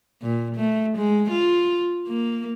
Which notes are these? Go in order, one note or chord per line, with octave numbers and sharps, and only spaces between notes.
A#2
A3
G#3
F4
A#3